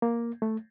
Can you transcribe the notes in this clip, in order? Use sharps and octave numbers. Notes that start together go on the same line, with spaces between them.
A#3
A3